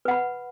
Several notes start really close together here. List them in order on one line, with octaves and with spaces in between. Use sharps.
B4 F#5 B5